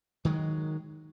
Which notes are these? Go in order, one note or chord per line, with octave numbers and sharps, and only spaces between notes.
D#3 F#3 G#3